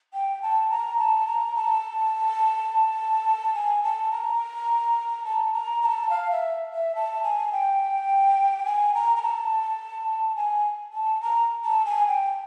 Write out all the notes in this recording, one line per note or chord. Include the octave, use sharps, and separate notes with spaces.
G5
A5
A#5
A5
A#5
A5
G#5
A5
A#5
A5
A#5
A#5
A5
F5
E5
E5
A5
G#5
G5
G#5
A#5
A#5
A5
G#5
A5
A#5
A5
G#5
G5